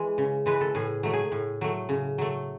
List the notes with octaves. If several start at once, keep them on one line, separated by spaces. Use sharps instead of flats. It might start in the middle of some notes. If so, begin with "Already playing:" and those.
Already playing: E3 G#3
C#3
E3 G#3 B4
A4
A2 G#4
F#3 A3
G#4
A2
F#3 A3
C#3
F#3 A3